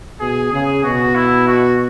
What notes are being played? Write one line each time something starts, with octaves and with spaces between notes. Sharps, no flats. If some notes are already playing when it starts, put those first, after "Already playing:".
B2 G#4
C#3 G#4
B2 F#4
E4
F#4